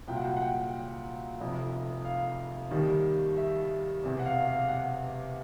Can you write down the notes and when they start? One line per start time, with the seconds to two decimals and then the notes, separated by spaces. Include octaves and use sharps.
0.07 C2 A#2 F#3 G5
0.17 F#5
0.25 G5
0.37 F#5
0.41 G5
1.40 F1 F2 C3
2.05 F5
2.71 D#2 D#3 G3
3.37 E5
4.04 E1 E2 C3
4.19 F#5
4.25 F5
4.47 F5
4.68 F#5